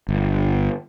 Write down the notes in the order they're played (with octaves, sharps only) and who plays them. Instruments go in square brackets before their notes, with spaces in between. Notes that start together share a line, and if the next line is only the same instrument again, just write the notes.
[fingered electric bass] G1